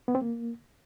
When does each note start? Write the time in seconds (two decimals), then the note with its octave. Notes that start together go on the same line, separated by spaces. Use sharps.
0.08 B3
0.15 C4
0.21 A#3